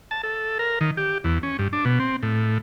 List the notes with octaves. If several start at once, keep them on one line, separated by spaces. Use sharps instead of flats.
A5
A4
A#4
D#3
G4
E2
C#4
G2
D4
B2
C4
A2